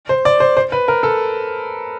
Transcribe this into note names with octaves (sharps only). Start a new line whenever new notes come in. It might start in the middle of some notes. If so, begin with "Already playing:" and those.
C5
D5
C5
C5
B4
A#4
A4